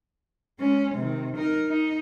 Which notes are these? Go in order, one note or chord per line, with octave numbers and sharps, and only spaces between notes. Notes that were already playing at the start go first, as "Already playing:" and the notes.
G#3 C#4
C3 D#3
D#4 A#4
D#4